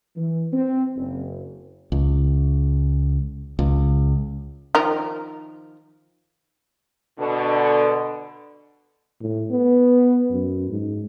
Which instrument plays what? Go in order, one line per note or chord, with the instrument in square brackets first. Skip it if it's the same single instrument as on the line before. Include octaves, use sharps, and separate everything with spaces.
[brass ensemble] E3
C4
F#1
[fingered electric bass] C#2
C#2
[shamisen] D#3 F3 A#4
[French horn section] B2 D3
[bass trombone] A2
B3
F#2
G#2